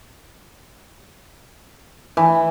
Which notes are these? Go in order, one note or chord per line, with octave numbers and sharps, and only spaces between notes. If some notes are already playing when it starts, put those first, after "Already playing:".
E3